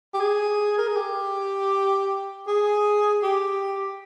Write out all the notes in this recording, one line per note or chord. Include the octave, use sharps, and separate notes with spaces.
G4
G#4
A#4
G#4
G4
G#4
G4